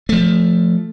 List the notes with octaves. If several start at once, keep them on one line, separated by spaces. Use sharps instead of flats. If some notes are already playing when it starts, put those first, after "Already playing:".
F3 A3